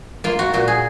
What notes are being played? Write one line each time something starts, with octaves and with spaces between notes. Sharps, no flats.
A#3 F4
F#4
A#2 F#4
G#4